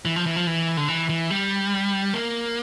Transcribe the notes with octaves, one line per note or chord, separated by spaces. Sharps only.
E3
F3
E3
F3
E3
D3
E3
E3
G3
A#3